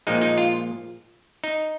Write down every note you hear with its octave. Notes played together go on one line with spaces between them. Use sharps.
A#2 F3 G#3 D#4
D#4
F4
D#4